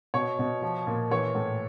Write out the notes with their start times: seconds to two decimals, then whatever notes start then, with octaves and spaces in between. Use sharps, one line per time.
0.14 B2 C#5
0.39 B2
0.62 F3
0.87 A#2
1.11 E3 C#5
1.35 A2